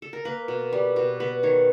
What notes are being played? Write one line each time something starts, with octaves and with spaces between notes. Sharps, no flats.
A4
A#4
A#3 B4
B2
G3
B2
B3 B4
D#3 C#5